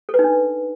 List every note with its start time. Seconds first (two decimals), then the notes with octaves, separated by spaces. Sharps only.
0.09 A4
0.14 B4
0.19 D#4
0.24 D4